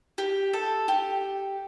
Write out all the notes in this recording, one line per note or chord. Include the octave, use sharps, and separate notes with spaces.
G4
A4
G4